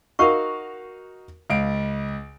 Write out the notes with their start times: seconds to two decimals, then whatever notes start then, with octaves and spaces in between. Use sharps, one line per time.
0.19 D#4 F#4 A#4 F5 C#6
1.50 C#2 F5 D7